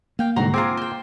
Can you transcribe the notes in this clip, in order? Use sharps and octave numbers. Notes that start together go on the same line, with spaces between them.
A#3 F5 G5
C2 G#2 D3 F#4 A#5 C6
C4 F4 G#4 G#5 A#5 D6
C5 G5